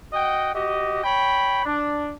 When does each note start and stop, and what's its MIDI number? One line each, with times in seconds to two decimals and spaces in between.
0.13 0.53 66
0.13 0.53 75
0.13 0.53 78
0.13 0.53 79
0.55 1.04 66
0.55 1.04 67
0.55 1.04 75
1.04 1.65 73
1.04 1.65 79
1.04 1.65 83
1.66 2.13 62